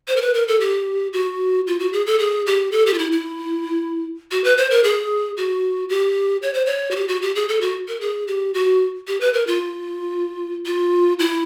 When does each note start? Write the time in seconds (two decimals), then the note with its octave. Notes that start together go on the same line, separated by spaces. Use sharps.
0.08 C5
0.16 A#4
0.22 B4
0.34 A#4
0.48 A4
0.60 G4
1.13 F#4
1.67 F4
1.80 F#4
1.93 G#4
2.06 A4
2.19 G#4
2.46 G4
2.72 A4
2.86 G4
2.94 F4
2.98 E4
3.12 E4
4.31 F#4
4.44 B4
4.57 C5
4.70 A#4
4.84 G#4
5.37 F#4
5.89 G4
6.42 C#5
6.54 C5
6.66 C#5
6.91 F#4
6.96 G4
7.08 F#4
7.22 G4
7.35 G#4
7.49 A4
7.61 F#4
7.88 A#4
8.01 G#4
8.27 G4
8.54 F#4
9.08 G4
9.21 B4
9.33 A#4
9.47 F4
10.66 F4
11.19 E4